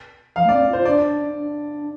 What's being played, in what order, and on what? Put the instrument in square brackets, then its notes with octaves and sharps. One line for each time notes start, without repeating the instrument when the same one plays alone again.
[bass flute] F3 [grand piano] F5
[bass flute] A3
[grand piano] D5
[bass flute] C4
[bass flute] F4 [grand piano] C5
[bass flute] D4 [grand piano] D5
[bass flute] D4